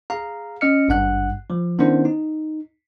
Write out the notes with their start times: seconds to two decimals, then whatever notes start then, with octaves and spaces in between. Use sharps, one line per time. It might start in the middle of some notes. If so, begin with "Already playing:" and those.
0.10 G#4 F5 A#5
0.61 C#4 D#5 F6 C#7
0.88 G#1 G2 F#5 F#6
1.50 F3
1.79 D#3 B3 C#4 D4 E4 C5
2.05 D#4